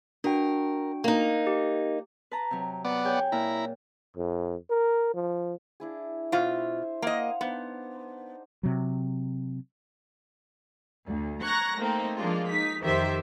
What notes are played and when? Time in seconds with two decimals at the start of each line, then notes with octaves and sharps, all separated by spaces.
0.24 D4 F#4 A#4 G5
1.04 A#3 D#4
1.47 G4
2.31 B4 A5 A#5
2.51 C3 F#3
2.85 B3 D5 F#5
3.04 G#4 C#5 G5
3.32 A#2 E4 A#5
4.17 F2
4.70 A#4
5.15 F3
5.80 D4 E4 G#4
6.32 B2 F4 C5 E5
7.02 A#3 D#5 F5 F#5
7.41 B3 D4 D#4 C5
8.63 C3 F#3
11.07 D2
11.44 A#5 C#6 F#6 G#6 A#6
11.79 A3 A#3 C4 D#4
12.19 F3 G#3 A#3 D4 F4
12.51 D#4 B6
12.83 F2 D#3 G4 C5 E5